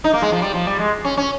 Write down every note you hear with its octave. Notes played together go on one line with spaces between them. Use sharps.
D#4
A#3
G#3
F3
G3
F3
G3
G#3
C#4
C#4